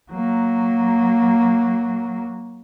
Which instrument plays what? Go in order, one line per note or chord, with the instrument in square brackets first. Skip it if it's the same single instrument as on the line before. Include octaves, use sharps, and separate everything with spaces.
[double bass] F#3 A#3